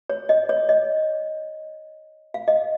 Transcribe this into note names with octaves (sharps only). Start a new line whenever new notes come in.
C#5
D#5
C#5
D#5
F5
D#5